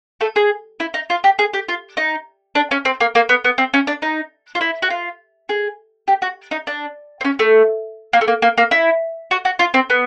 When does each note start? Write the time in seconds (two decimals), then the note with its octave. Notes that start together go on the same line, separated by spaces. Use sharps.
0.21 A3 A4
0.36 G#4
0.80 E4
0.94 D#4
1.10 F4
1.24 G4
1.39 G#4
1.54 G4
1.69 F4
1.97 D#4
2.55 D4
2.71 C#4
2.85 C4
3.01 A#3
3.15 A#3
3.29 B3
3.45 B3
3.58 C4
3.74 C#4
3.87 D4
4.02 D#4
4.55 F4
4.61 E4
4.82 F#4
4.90 F4
5.49 G#4
6.08 G4
6.22 F#4
6.51 D#4
6.67 D4
7.21 C4
7.25 C#4
7.39 A3
8.13 A#3
8.21 A3
8.28 A#3
8.42 A#3
8.58 A#3
8.71 E4
9.31 F#4
9.45 F#4
9.59 F4
9.74 C4
9.90 B3